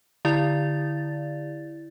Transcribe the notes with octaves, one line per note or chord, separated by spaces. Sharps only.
D3 E4 D5 A6